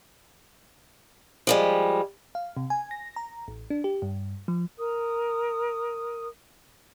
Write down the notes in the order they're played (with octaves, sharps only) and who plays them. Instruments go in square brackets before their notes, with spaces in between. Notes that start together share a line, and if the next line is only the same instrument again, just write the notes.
[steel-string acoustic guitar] F3 G3 G#3
[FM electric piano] F5
C3
G#5
A#6
A#5
A1
D4
G4
G2
F3
[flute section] A#4 D#6